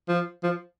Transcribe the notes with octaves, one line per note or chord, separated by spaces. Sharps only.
F3
F3